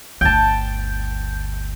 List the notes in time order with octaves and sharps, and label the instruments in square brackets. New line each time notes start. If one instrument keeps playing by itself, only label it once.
[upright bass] G1 D2 [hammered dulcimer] G5 A5